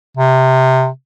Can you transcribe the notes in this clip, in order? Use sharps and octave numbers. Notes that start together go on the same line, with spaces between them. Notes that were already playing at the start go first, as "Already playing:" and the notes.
C3